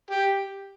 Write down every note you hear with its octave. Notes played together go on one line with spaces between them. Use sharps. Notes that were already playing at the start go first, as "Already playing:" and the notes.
G4